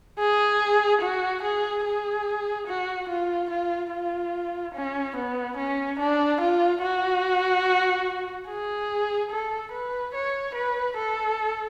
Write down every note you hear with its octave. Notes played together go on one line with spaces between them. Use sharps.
G#4
F#4
G#4
G#4
F#4
F4
F4
F4
C#4
B3
C#4
D4
F4
F#4
G#4
A4
B4
C#5
B4
A4